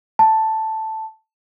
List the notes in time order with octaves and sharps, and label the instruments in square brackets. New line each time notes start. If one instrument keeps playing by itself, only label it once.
[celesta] A5